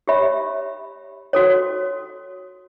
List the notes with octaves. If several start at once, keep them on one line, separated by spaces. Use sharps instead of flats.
G4 C#5 E5 B5
F#4 A4 C#5